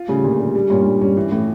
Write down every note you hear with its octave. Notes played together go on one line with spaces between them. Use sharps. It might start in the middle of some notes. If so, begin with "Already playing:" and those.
Already playing: F4
A2 C#3 G3
A#2 D3 G3
G3
G3
G2 A#2 C#4
G2 G3
G2 C#4
E3
A2 E3